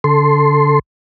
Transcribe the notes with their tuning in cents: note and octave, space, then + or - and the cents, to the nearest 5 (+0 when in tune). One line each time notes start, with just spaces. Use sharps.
D3 -40 A4 +0 C6 +0